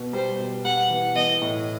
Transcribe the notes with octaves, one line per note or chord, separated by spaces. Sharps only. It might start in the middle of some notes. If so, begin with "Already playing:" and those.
Already playing: B2
G3 C5
B2
G3 F#5
E3
E3 D#5
A2